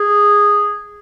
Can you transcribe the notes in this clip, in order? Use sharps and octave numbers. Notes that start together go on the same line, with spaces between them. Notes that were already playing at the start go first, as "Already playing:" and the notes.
Already playing: G#4